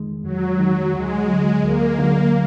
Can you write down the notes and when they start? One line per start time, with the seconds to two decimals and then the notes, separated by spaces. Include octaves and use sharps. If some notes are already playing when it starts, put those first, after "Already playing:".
Already playing: F2 D#3 G#3
0.24 F2 F#3
0.58 D#3 G#3
0.93 D2 G#3
1.28 D3 F#3
1.63 D2 A#3
1.99 D3 F#3